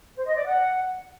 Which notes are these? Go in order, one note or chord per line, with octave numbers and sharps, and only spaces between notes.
C5
D#5
D5
F#5